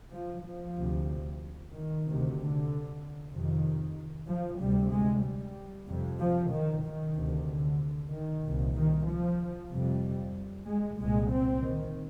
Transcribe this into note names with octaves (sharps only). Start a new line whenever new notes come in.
F3
F3
D2 C3
D#3
D2 C3
D3
F2 C3 D#3
F3
D2 C3 G3
G#3
G3
F2 C3
F3
D#3
D#3
D2 C3
D3
D#3
C2 A#2
D#3
F3
F2 C3 G3
G#3
C2 A#2 G#3
C4
D#3